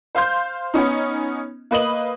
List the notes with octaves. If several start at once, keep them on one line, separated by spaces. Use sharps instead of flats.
C5 F5 C6 G6
B3 C#4 D#4
A#3 B4 D#5 F#7